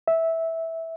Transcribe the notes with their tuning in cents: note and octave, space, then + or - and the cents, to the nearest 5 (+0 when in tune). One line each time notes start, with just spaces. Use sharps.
E5 -10